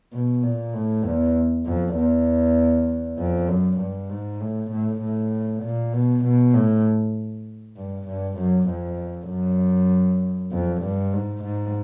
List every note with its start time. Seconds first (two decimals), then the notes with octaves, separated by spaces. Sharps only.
0.13 B2
0.43 A#2
0.74 A2
1.04 E2
1.66 F2
1.96 E2
3.18 F2
3.48 F#2
3.80 G2
4.10 G#2
4.41 A2
4.71 A2
5.01 A2
5.63 A#2
5.93 B2
6.24 B2
6.54 A2
7.77 G2
8.07 G2
8.38 F#2
8.69 F2
9.30 F#2
10.52 F2
10.82 G2
11.13 G#2
11.43 G#2